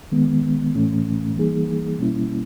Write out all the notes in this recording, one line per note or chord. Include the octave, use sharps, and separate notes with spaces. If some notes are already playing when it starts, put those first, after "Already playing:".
D#3 G#3 B3
A2 E3 A3 C#4
E3 G3 A#3 D#4 G#4
B2 G3 A#3 C#4 E4